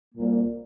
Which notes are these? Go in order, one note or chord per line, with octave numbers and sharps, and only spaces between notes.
C2 A#2 G3 A#3